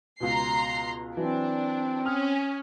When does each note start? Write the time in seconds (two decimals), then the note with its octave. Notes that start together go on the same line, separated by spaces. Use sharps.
0.20 C#2 B2 A#5 C6 C7
1.17 E3 F#3 C4 D4
2.05 C#4 D#6 F6